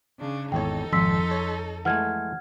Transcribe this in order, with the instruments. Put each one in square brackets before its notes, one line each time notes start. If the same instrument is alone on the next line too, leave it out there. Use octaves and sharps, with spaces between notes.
[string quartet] C#3 D4
[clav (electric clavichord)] G#1 E2 C#5 [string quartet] D#4 A4 [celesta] G5
[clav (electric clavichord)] G#1 [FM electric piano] F2 [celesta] C6 E6 B6
[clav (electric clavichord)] C#5
[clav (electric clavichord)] E3 G#3 A3 [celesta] F#5 F6 G#6